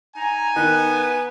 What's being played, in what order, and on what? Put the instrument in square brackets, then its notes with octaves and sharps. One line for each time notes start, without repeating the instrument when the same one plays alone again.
[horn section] D#4 G#5 [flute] A#5
[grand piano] D#3 [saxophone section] B3 [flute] F#6